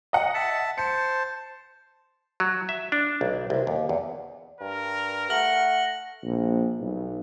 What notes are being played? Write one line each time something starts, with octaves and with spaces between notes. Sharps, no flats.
D#5 F#5
E5 A5
C5 A5 C#7
F#3
E5
D4
B1
C2
D#2
E2
G2 A#4
A3 F#5 F6 A#6 F#7
A#1
B1